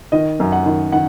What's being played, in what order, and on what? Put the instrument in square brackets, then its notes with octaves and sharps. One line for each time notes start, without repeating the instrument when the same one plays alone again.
[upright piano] D#3 D#5
F#2
F#5
D#3
D#3 F#5